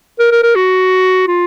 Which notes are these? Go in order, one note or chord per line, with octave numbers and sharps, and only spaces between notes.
A#4
A#4
A#4
F#4
F4